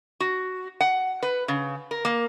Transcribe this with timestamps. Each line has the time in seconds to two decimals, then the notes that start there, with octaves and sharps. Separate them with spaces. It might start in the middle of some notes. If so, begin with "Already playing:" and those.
0.20 F#4
0.81 F#5
1.23 B4
1.48 C#3
1.91 A#4
2.05 A#3